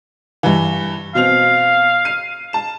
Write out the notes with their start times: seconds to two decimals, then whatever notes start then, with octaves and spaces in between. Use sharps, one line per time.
0.43 G2 E3
1.15 B2 C4 F5 F7
2.05 C7 D#7
2.53 A5 E7